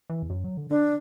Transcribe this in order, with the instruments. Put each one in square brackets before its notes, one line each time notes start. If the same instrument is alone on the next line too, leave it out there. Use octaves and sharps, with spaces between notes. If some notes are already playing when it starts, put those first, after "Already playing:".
[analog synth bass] E3
E2
F#2
F#3
D3
[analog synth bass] D3 [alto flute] D4